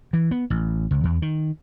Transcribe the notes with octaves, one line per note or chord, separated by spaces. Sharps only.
E3
B3
A1
C#2
E2
D#3